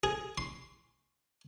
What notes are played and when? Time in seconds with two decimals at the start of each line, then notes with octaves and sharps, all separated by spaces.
0.03 G#4
0.38 C6